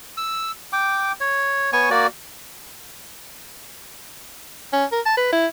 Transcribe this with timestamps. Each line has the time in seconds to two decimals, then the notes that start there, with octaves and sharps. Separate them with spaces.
0.17 E6
0.73 G5 D6
1.20 C#5
1.73 B3 C#5 G#5 C#6
1.90 A#3 F#4 D5
4.73 C#4
4.92 A#4
5.06 A5
5.17 B4
5.33 E4